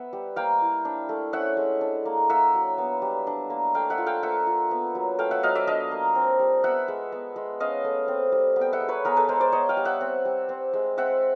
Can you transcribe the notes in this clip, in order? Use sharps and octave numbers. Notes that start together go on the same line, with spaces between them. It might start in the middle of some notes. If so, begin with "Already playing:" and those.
Already playing: B3 E5 F#5
G3
A#3 F5 G5
E4
D4
A3
C#4 E5 F#5
G#3
D4
A#3
A#3 E5 F#5
F#3
B3
G3
D4
A#3
A3 F5 G5
E5 F#5
F4
F5 G5
A#3 E5 F#5
F4
B3
F#3
A3 F5 G5
E5 F#5
F#3 D#5 F5
D5 E5
D4 D#5 F5
A#3
C4
G3
B3 E5 F#5
G#3
B3
G#3
C#4 D#5 F5
A3
C4
G3
B3
G5
E5 F#5
G#3
B4 C#5
B3 G#4 A#4
A4 B4
G#3 A#4 C5
C5 D5
B3 C#5 D#5
F5 G5
G3
E5 F#5
C4
G3
C4
G#3
C4 E5 F#5